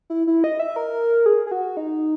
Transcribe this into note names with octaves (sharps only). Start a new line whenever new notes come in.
E4
E4
D#5
E5
A#4
G#4
G#4
F#4
D#4